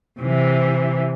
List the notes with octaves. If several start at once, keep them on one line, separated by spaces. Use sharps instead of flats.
C3 E3